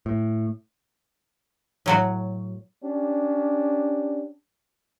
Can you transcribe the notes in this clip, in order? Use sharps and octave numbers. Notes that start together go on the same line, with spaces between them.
A2
A2 F#3 F#4
C#4 D4 G4